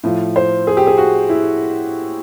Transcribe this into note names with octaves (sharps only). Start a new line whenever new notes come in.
A2 F3
C5
G#4
G4
G#4
F#4
E4